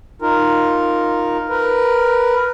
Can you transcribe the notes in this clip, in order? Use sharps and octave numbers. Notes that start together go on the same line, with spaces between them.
D#4 F4 A#4
A#4 B4